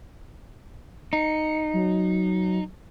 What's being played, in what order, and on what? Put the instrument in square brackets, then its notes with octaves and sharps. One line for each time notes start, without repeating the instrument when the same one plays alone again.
[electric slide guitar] D#4 [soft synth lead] C#7
[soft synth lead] F#3